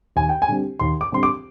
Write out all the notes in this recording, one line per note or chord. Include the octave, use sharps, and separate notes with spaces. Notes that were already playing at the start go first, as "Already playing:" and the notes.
D#2 G#5
G5
G#5
D3 G3 C4
D#2 C6
D6
D3 G3 C4 C6
D6